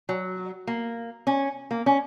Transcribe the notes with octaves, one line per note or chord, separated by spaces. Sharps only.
F#3
A#3
C#4
A#3
C#4